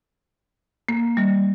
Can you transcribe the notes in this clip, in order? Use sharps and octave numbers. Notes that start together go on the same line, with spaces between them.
A#3
G3